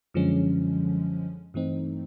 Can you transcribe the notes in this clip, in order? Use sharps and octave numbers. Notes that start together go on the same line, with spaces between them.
F#2 D3 F3 G#3 C#4
G2 E3 A3 C4 D#4